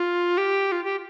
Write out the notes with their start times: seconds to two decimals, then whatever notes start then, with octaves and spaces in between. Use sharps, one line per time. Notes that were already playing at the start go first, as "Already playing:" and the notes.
Already playing: F4
0.38 G4
0.72 F4
0.84 G4